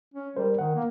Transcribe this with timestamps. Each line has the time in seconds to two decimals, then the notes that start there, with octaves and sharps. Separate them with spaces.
0.14 C#4
0.37 G3 A#4 C5
0.59 D#3 F#5
0.76 A#3